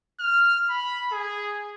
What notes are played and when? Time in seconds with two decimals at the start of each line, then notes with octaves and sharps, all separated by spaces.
0.20 F6
0.70 B5
1.12 G#4